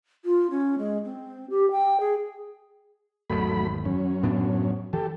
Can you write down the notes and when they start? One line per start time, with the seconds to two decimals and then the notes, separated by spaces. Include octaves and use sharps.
0.25 F4
0.50 C#4
0.78 G#3
1.04 C4
1.49 G4
1.71 G5
2.00 G#4
3.30 G#1 E2 D#3 F#3 A3 B5
3.85 F#2 C#4
4.23 A2 B3 D4
4.93 E3 G4 A4